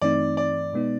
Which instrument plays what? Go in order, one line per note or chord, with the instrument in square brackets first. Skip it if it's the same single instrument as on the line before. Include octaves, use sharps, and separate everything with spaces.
[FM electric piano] G2 E3 A3 C4 D#4 [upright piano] D5
[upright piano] D5
[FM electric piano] B2 G#3 B3 D#4